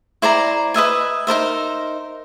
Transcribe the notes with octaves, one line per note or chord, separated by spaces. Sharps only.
E4 C5 D5 A#5
B4 D#5 E5 G#5
D#4 A#4 C5 E5